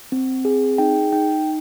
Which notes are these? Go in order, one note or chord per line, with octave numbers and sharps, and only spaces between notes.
C4
G#4
D#4 G5
D#4 G5